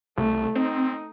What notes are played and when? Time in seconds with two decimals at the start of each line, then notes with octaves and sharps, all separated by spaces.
0.18 C2 A3
0.55 C4 D#4